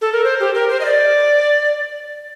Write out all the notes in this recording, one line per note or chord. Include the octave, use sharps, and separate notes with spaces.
A4
A#4
C5
G4
A#4
C5
D#5
D5